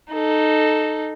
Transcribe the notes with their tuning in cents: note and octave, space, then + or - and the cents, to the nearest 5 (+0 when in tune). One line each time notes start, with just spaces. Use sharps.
D#4 -10 A4 -10